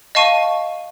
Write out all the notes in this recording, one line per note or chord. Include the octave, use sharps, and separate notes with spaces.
D#5 F5 A5 C#6 D#7